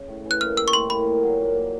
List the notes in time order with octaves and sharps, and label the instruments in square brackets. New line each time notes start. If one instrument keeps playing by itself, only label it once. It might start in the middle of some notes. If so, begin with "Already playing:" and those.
Already playing: [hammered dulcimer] C#3
A2
E3
[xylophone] F#6
[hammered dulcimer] A#3 [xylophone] F6
[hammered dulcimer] G3 [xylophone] E6
[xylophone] C#6
[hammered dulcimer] A2 [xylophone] C6
[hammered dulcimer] A#3 [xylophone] B5
[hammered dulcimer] A#2
F#3
A#2
A#3